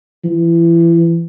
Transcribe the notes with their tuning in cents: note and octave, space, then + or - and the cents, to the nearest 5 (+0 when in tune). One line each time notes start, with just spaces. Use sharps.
E3 +30